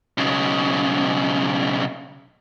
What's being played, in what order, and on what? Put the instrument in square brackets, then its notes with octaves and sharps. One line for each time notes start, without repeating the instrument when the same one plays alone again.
[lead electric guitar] B1 C#3